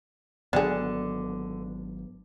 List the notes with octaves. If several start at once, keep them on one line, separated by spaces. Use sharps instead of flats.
G#1 D3 F#3 B3 D4 G#4